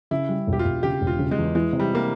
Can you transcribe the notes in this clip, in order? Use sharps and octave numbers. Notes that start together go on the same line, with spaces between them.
C#3 E4
G3
E1
G4
F4
E1
C#3 G4
E1
F4
C#3
G#3
E2
E3 G#3
C3
G3
E3 A#3